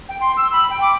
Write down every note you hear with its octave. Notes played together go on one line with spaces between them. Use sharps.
G5
C6
E6
B5
G5
D6